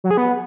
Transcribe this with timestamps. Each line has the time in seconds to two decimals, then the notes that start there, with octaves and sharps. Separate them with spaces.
0.04 F#3
0.11 G#4
0.17 B3